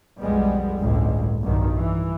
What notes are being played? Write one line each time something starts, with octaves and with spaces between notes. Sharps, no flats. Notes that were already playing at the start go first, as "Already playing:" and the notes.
B1 F2 G3 G#3 B3
G1 C#2 A2 G#3
B1 G2 D#3
E3